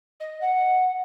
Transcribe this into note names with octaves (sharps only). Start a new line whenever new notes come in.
D#5
F#5